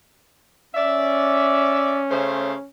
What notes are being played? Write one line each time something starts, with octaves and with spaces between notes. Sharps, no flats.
C#4 D5 E5
C#3 A3 C5